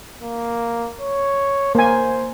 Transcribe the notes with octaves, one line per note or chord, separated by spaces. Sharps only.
A#3
C#5
A#3 C5 G#5